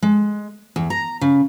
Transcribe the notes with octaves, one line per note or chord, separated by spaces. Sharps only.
G#3
E2
A#5
C#3